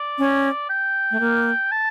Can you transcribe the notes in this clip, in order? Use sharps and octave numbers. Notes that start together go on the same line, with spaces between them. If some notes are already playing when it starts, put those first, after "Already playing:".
Already playing: D5
C#4
G5
A3
A#3
A5